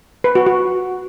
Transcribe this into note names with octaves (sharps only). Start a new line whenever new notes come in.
B4
F#4
F#4